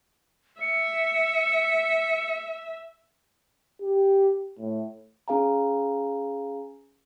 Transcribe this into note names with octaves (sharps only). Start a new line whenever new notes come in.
E5 C#7
G4
A2
C#4 G#4 F5 G#5 A#5